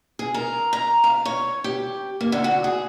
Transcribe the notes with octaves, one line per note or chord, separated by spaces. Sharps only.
G#4
A#4
A#5
F5
C#5
G4
A#3
D3
F#4
G#4